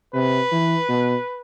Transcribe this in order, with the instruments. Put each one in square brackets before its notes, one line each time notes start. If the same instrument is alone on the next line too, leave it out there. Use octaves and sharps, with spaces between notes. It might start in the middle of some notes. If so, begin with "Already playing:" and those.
[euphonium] C3 [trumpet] B4
[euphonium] E3
B2